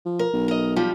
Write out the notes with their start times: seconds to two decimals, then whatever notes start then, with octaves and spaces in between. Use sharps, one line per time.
0.06 F3
0.19 A#4
0.33 B1
0.48 A#4 D#5
0.76 F3 G3 F4